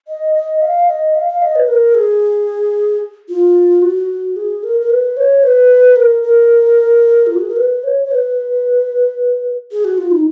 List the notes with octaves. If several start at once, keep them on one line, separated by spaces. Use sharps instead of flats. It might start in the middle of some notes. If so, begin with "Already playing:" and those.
D#5
D#5
F5
D#5
F5
F5
D#5
B4
A#4
G#4
F4
F#4
G#4
A#4
A#4
B4
C#5
B4
A#4
A#4
F4
F#4
G#4
A#4
B4
C#5
C#5
B4
G#4
F#4
F4
D#4